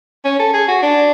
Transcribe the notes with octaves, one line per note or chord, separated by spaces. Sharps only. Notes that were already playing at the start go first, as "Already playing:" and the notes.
C#4
A4
G#4
F#4
D4